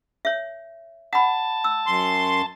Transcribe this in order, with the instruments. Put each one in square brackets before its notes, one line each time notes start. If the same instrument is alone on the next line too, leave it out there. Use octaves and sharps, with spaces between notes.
[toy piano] C#5 E5
[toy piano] F#5 B5 [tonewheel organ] A5
[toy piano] E6
[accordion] F#2 C6